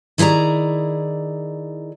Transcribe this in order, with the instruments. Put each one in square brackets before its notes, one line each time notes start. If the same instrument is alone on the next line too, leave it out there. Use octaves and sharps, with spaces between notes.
[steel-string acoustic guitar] D#3 E4 G#4 D5 A#5